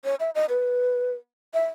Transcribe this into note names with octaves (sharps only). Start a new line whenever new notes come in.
C#5
E5
D#5
B4
E5